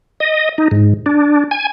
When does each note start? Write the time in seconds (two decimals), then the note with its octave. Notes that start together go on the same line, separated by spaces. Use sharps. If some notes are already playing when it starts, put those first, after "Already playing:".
0.20 D#5
0.58 D#4
0.71 G#2
1.06 D4
1.51 G#5